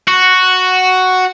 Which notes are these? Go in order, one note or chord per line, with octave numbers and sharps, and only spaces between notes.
F#4